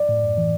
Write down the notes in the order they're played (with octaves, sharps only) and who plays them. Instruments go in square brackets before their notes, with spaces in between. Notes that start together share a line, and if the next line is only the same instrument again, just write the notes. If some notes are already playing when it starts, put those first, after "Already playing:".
Already playing: [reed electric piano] D5
A2
F#2
E3